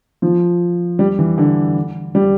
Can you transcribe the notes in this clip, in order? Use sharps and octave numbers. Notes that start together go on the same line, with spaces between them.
F3
G3
E3
D3
G3